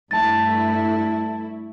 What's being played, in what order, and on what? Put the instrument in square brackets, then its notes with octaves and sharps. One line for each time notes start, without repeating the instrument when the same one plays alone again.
[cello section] G2 A3 E4 [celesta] A5 A6